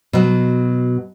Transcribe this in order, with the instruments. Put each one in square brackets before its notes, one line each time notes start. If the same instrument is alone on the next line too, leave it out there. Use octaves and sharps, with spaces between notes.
[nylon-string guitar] B2 F#3